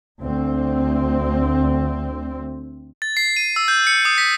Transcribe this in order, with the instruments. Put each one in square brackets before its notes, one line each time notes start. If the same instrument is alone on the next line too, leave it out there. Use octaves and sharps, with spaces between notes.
[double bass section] D2 C4
[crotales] A6
C7
D#7
E6
G6
C#7
D#6
B6